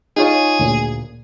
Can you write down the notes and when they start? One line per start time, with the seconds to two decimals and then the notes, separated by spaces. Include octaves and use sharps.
0.17 D#4 F4 G#4 C#5
0.59 D2 A#2